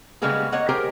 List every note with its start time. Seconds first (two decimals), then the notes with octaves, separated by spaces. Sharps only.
0.22 C#3 G3 G#3 A#3 B3 G#4
0.52 A#3 C#5 D#5 F#5
0.69 G4 G#4 A#4 C5